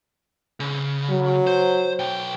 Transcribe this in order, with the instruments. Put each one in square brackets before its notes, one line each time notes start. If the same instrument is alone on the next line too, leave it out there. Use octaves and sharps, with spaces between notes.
[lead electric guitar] C#3
[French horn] F#3
[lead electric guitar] C5
B1 G5